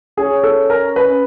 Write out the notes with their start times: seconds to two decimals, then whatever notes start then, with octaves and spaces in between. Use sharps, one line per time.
0.17 C#4 G#4
0.44 A4
0.70 A#4
0.96 B4